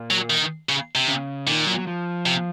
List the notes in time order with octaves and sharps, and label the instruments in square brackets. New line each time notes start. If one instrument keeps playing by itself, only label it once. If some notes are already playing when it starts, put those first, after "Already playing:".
Already playing: [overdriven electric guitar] A#2
[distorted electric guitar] F#3
D#3
C#3
C3
[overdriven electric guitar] C#3
[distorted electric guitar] A#2 [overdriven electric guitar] D#3
[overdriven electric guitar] F#3
F#3
F3
[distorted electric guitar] C3